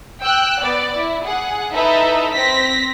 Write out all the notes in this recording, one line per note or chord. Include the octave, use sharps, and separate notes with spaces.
G5 E6 F#6
B3 D5
E4
G#4 F#5
D#4 E4 A4 B4 D#5 E5
C4 A#6 B6